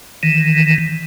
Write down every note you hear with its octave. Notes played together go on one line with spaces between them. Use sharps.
D#3 E3